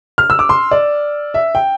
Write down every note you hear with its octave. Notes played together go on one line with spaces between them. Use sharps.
F6
E6
D6
C6
D5
E5
G5